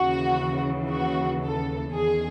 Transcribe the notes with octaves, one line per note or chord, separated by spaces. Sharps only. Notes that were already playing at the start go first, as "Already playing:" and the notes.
Already playing: D#2 C#3 E3 F#4
F#4
A4
E2 D#3 G#4